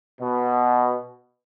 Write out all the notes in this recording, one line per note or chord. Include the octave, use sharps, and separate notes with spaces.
B2